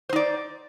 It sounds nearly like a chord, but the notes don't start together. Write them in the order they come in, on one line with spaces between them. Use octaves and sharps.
C5 D#4 D5